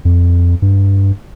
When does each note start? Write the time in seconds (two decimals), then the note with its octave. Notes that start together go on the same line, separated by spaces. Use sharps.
0.05 F2
0.62 G2